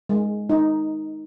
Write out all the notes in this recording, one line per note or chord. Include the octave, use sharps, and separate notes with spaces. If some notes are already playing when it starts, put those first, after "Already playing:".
G#3
D#4